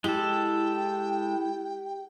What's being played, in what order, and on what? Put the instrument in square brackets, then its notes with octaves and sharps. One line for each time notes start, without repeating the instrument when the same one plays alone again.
[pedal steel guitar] G#3 A4 [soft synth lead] E4 [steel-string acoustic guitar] G4 [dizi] G5